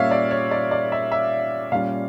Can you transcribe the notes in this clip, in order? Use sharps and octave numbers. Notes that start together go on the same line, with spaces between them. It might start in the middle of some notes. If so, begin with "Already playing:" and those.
Already playing: A#2 G3 A#3 C#4 C#5 E5 F5
D5
C#5
D5
D5
E5
E5
A#2 G3 C#4 F5